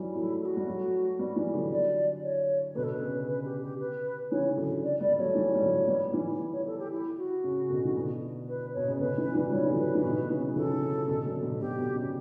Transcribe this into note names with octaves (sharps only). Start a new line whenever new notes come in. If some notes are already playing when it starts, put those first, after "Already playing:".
Already playing: E3 F#3 G3
F#3 A3 E4
A4
F#4
G3
F#3 A3
G3 B3
E3 G3
D3 F#3
D5
C#5
B2 D3 B4
A4
B4
C#3
B4
G4
G4
B4
C#3 E3 C#5
D3 F#3
D5
G3 B3 D5
F#3 A3 C#5
E3 G3
G3
D3 F#3
G3 B3
E3 G3
C#5
A4
G4
E4
F#4
C#3
B2 D3
E3
B2 D3
B4
B2 C#5
C#3
B2 D3 B4
C#3 E3
E3 G3
F#3
E3 G3 C#5
E3
D3 F#3
B4
E3
B2 D3
C#3 E3
F#3
C#3 E3 A4
C#3
B2 D3
D3 F#3
B2 D3
B2 D3 G4
B2
B2
C#3